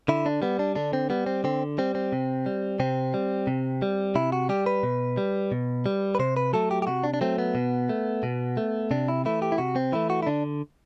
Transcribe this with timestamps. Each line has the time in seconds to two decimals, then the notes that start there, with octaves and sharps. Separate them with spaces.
0.08 D3 E4
0.26 D4
0.42 G3 B3
0.59 D4
0.76 D3 D4
0.93 C4
1.10 G3 B3
1.26 C4
1.44 D3 C4
1.78 G3 C4
1.95 C4
2.13 C3
2.46 G3
2.80 C3 C4
3.14 G3
3.47 C3
3.82 G3
4.15 C3 E4
4.32 F#4
4.49 G3 G4
4.66 B4
4.83 B2
5.17 G3
5.52 B2
5.86 G3
6.15 B4
6.19 C3 C5
6.37 B4
6.53 F#3 A3 A4
6.71 G4
6.82 G4
6.87 C3 F#4
7.04 D4
7.14 D4
7.21 F#3 A3 C4
7.38 B3
7.55 B2
7.89 A3
8.23 B2
8.57 A3
8.91 C3 D4
9.08 E4
9.25 E3 A3 E4
9.42 G4
9.52 E4
9.58 C3 F#4
9.76 C4
9.92 E3 A3 E4
10.10 F#4
10.23 E4
10.27 D3 D4